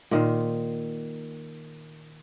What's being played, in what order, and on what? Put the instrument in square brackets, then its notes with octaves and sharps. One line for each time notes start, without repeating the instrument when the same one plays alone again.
[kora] A#2 D#3 C5